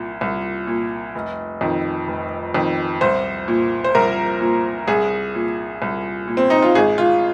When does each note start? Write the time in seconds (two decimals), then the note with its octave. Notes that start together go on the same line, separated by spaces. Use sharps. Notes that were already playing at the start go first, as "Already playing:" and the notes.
Already playing: C2 A#2
0.21 C2
0.67 A#2
1.15 F1
1.61 F2 D#3
2.07 F1
2.54 F2 D#3
3.01 C2 C5
3.48 A#2
3.84 C5
3.95 C2 A#4
4.41 A#2
4.88 C2 G#4
5.35 A#2
5.82 C2
6.28 A#2
6.37 C4
6.50 D#4
6.62 F4
6.75 G#1 G#4
6.98 F4